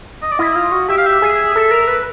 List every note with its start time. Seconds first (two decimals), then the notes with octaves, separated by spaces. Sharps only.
0.22 D#5
0.31 D5
0.39 E4 D#5
0.56 F4
0.72 F#4
0.88 G4 E5
0.98 F5
1.07 E5
1.22 G#4
1.56 A4
1.71 A#4
1.87 B4